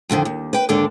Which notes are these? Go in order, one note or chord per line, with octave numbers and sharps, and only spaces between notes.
F2 A2 D3 D#3
D#2
B4 G5
D#2 G#2 D3 D4 A4